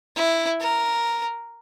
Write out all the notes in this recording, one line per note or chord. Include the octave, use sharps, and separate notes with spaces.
E4
A#4